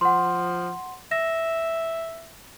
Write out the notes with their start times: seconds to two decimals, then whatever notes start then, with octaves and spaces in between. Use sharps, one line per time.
0.01 F3 F#5 C6
1.11 E5 A#6